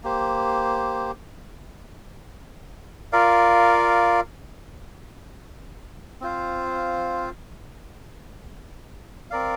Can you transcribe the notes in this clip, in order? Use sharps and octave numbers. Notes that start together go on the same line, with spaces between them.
A#3 G4 C5
F4 A#4 D5 F5
C4 F4 C5 F5
C4 A#4 D5 F5